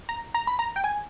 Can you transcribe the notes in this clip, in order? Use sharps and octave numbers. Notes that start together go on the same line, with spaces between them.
A#5
A#5
B5
A#5
G5
G#5